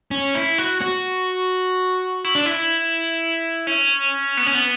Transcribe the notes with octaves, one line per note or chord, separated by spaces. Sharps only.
C#4
E4
F#4
F#4
E4
D4
E4
C#4
B3
C#4
B3